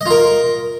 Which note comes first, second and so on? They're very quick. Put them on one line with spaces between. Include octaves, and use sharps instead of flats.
D#5 F4 A#4